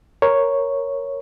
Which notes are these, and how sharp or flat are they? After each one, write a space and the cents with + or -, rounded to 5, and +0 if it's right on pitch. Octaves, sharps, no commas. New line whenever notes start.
A#4 +0 C#5 +0